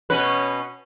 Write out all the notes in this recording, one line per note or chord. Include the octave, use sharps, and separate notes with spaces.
B2 C#4 B4